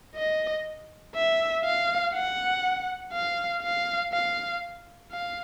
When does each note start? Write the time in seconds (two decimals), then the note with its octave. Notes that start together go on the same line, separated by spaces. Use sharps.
0.15 D#5
1.15 E5
1.64 F5
2.14 F#5
3.13 F5
3.62 F5
4.13 F5
5.12 F5